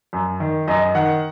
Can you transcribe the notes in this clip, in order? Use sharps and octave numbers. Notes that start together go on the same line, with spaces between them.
F#2
D#3
F#2 D#5
D#3 F#5